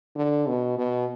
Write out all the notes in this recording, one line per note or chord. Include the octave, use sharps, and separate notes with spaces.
D3
B2
B2